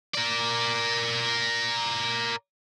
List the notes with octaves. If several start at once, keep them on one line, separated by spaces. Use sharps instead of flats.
A#4 D5